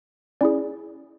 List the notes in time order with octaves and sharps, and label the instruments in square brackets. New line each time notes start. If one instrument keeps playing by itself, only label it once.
[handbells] C#4 E4 G#4 D5